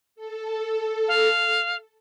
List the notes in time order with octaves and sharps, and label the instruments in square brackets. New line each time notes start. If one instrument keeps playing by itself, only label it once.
[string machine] A4
[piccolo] F5